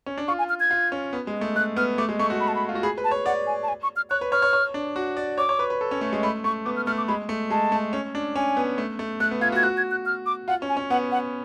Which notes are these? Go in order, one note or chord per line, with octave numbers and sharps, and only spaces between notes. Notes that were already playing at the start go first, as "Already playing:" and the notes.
C#4
D4
F4 C#6
G#5
F6
G#6
F4
C#4
B3
G#3
A3
A3 F#6
B3 F6
A3 D6
G#3
A3 C#6
F#4
B5
A5
B5
F4
F#4
G#4 B5
B4
A5
C#5
D5 F#5
G#5
A5
G#5
C#6
F6
C#5 F#6
B4
C#5 F6
C#5
C#5
D4
F#4
D5
C#5 D6
C#5
B4
B4
A4
C#4
A3
G#3
A3 B5
A3 C#6
B3 D6
F6
A3 F6
D6
G#3 B5
A3
G#3 A5
A3
C#4
D4
C#4 G#5
B3
A3
A3
A3 F#6
B3
F4 G#6
F#4
G#6
F#4 F#6
G#6
F#6
F6
D6
F4 F#5
C#4
G#5
C#4
B3 F#5
F#5